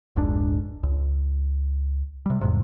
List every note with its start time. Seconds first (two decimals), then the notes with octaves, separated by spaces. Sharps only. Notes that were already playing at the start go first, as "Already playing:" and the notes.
0.16 F1 C#2 G#2 D4
0.83 C#2
2.26 C3 G3
2.41 E2 G#2 C3